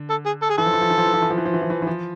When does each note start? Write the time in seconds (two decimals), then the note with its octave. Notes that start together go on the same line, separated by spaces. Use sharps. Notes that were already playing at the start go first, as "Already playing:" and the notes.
Already playing: D3
0.10 A4
0.26 G#4
0.42 A4
0.50 G#4
0.58 E3 A4
0.66 F3
0.74 E3
0.81 F3
0.90 E3
0.98 F3
1.06 E3
1.13 F3
1.22 E3
1.30 F3
1.38 E3
1.45 F3
1.54 E3
1.62 F3
1.70 E3
1.82 E3
1.87 F3